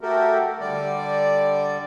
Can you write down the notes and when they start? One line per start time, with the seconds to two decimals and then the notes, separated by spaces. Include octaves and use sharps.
0.01 A3 F#4 G4 A4 A#4
0.60 D3 G3 D5